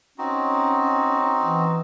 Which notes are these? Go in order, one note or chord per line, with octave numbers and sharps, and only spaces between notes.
C4 C#4 D#4 F#4
E3